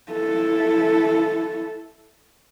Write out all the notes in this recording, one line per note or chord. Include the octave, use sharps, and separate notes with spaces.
E4 A4